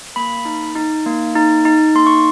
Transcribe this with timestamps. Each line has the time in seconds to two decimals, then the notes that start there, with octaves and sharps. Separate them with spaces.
0.16 A#3 B5
0.45 D#4
0.75 D#4
1.06 A#3
1.36 D#4
1.65 D#4
1.95 A#3 C6
2.07 C#6